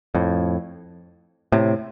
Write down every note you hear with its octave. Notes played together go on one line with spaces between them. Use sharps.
F2 A2
A2 C3